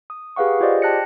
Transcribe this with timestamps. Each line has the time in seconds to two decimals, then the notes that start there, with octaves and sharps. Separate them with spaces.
0.10 D#6
0.36 G4 G#4 B4 F5 F#5 C#6
0.60 F4 G4 G#4 C5 D5 D#5
0.82 G5 A5 F#6 A#6 C#7